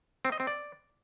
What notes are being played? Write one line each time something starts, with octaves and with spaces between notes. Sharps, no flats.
C4
D#5
C4
D5